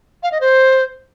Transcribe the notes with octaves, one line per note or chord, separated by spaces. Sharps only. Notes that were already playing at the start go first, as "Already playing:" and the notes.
F5
D#5
C5